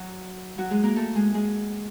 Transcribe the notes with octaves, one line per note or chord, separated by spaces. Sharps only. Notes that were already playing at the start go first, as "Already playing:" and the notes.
Already playing: F#3 F#4
F#3 F#4
G#3 G#4
A#3 A#4
A3 A4
G#3 G#4
G#3 G#4